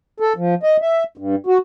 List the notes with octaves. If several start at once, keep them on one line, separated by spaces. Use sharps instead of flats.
A4
F3
D#5
E5
G2
F#4